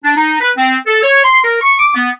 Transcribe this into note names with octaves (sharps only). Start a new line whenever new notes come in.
D4
D#4
B4
C4
A4
C#5
C6
A#4
C#6
D6
B3